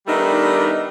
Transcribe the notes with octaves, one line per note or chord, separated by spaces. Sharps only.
D#3 G3 A3 B3 D4 D#4